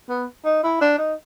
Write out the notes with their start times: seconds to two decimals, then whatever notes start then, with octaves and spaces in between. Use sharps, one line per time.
0.09 B3
0.45 D#4
0.64 E4
0.81 D4
0.98 D#4